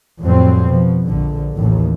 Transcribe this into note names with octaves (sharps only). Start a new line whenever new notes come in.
F2 A2 F#3 G3 C4
B2 F3
A#1 D3
A1 D#2 A2